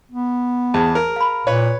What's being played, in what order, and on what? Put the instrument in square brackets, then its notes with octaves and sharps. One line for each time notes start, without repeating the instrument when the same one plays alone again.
[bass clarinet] B3
[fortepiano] E2 [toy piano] G#4 C5 A5
[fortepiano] A#4
[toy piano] F5 B5
[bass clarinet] A#2 [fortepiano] B4 C#5